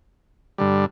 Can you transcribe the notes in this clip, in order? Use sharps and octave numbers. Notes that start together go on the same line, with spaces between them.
G2 D3 G3